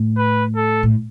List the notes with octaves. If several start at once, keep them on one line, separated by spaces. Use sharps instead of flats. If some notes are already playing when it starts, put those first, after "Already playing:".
Already playing: A2
B4
A4
A2